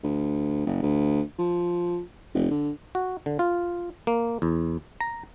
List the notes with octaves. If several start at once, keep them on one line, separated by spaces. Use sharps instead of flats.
D2
F#1
D2
F3
F1
D3
F#4
D3
F4
A#3
E2
A#5